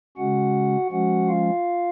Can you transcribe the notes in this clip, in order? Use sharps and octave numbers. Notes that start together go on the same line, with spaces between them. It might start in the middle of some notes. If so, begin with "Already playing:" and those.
C#3 G#3 C#4 F#4 F#5
F3 G#3 C#4 F#4 F#5
F4 F5